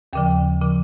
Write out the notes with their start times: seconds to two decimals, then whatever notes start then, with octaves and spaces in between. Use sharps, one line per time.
0.13 D#2 C#3 F3 G5
0.61 C#3 F3